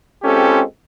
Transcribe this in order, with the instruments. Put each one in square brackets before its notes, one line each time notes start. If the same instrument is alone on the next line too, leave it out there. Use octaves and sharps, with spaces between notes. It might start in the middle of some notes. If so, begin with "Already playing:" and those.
[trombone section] G#3 C4 C#4 F4 G4 A4